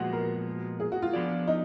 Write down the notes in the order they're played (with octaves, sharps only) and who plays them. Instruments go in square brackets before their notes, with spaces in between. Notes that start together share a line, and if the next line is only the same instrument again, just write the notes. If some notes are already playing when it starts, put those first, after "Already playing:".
Already playing: [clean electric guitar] A#2 F3 G#3 B3 [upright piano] F#4
[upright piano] A#4
G#4
F#4
F4
[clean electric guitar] F3 B3 D4 G#4 D5
[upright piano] D#4